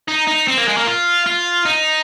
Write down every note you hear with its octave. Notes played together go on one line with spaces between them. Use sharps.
D#4
D#4
C4
A#3
G#3
A#3
F4
F4
D#4